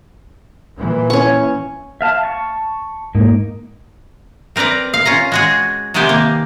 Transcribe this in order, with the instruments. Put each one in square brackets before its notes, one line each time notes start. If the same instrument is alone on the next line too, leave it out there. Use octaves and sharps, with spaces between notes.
[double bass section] A#2 E3
[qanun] C#4 C#6
[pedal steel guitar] E5 F5 A5
A5 C#6
[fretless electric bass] G#2 [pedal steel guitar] A#3 D#4
[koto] C4 A#4 B4 D5 A#5
F5
C#4 F4 A#5
G#3 F#4 G#4
C3 D#3 G#3 B3 G4 G#5
A#3